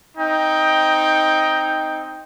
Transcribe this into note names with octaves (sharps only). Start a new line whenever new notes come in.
C4 D#4 G5